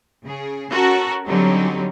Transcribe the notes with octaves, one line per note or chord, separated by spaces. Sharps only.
C#3 G#4
C#4 F#4 A4 A#4
D3 F#3 G3 C4 C#4 D#4